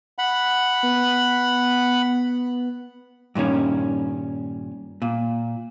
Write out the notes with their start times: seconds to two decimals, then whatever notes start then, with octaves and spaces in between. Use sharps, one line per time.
0.19 F#5 B5
0.83 B3
3.35 G2 A#2 D#3 C#4
5.02 A#2